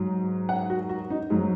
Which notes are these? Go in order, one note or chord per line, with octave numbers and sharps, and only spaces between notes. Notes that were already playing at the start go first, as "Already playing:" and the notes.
Already playing: G#2 F#3
F#5
F#4
F#4
D#4
G#2 F#3